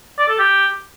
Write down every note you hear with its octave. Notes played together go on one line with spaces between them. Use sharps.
D5
A4
G4